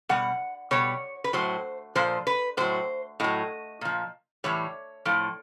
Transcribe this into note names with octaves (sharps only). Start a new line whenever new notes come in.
B2 G3 F#5
B2 G3 C#5
B4
A2 F#3 C5
A#2 F3 C5
B4
A2 F#3 C5
A2 F#3 D#5
A#2 F3
A2 E3 G3 C#5
A2 F3